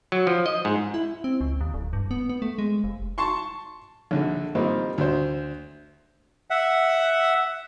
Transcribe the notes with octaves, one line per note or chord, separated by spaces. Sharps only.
F#3
F3
D#5
G#2
E4
C4
C#2
D#2
D1
G2
B3
B3
A3
G#3
F1
A5 C6 C#6
A#1 D3
D#3 F3 G3 A#3 C4 D#4
D2 C5
E5 F#5